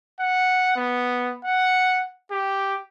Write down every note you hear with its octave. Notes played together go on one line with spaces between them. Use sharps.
F#5
B3
F#5
G4